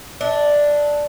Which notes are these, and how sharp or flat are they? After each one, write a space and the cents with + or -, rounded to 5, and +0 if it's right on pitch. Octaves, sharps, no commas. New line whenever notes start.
D4 +0 E5 -45